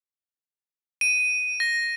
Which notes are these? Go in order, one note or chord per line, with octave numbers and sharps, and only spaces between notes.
D#7
A#6